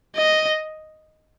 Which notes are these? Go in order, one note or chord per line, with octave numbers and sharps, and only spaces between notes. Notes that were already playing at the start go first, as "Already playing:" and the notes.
D#5